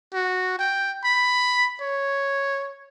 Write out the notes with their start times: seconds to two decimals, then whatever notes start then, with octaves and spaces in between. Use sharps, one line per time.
0.14 F#4
0.59 G5
1.04 B5
1.81 C#5